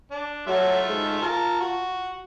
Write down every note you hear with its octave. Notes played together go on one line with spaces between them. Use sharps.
D4
F#3 A3 F4 E5
G#2
F4 A#4 A5
F#4